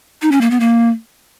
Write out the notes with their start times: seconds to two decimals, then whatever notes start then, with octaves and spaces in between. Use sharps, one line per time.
0.22 D#4
0.32 C#4
0.41 A#3
0.51 B3
0.60 A#3